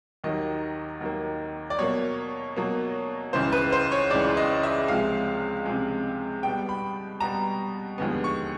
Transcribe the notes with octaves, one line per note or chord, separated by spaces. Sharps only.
D#2 D#3 F#3 A#3 D#5
D#2 D#3 F#3 A#3
D5
B2 F#3 A#3 C#5
B2 F#3 A#3
C#2 C#3 E3 C5
B4
C5
C#5
C#2 C#3 E3 D5
D#5
E5
C#2 C3 F3 G#3 F5
C#2 C3 F3 G#3
B2 G3 B3 G5
B5
B2 G3 B3 A#5
D#2 D3 F3 G#3 B3
C#6